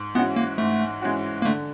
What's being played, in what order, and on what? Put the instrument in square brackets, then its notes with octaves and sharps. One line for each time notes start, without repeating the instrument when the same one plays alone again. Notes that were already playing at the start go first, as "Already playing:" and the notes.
Already playing: [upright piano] G#2
[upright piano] E3 G#3 C#4 F#4 [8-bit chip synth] B3
[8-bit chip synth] A#3
[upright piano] G#2 [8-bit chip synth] A3
[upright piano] E3 G#3 C#4 F#4
[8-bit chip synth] A#3
[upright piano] D3 [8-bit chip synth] A3